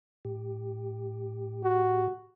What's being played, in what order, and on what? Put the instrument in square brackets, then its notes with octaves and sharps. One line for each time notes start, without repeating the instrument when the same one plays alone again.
[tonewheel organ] A2 G4
[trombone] F#4